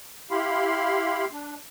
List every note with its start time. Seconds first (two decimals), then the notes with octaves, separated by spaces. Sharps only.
0.31 E4 G4 F5 B5 C6
1.32 D4